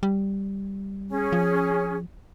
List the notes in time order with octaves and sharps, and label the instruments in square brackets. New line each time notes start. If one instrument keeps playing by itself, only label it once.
[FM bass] G3
[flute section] C#4 G#4
[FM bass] F3